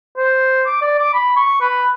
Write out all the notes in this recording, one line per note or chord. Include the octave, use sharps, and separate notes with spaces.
C5
D6
D5
D6
B5
C#6
B4